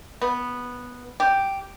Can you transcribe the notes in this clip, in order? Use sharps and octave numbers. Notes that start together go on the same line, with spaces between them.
B3
G4